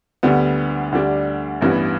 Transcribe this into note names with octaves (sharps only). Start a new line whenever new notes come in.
D2 D3 G3 B3
D2 D3 G3 D4
A1 G2 E3 B3